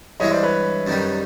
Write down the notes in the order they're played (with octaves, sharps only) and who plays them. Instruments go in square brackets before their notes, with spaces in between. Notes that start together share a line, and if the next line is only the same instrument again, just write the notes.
[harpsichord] G2 E3 G#3 [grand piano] C#5 D#5
[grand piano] C5 D5
B4 C#5
[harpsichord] F#2 D#3 G3